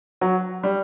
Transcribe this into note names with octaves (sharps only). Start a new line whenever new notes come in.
F#3
G3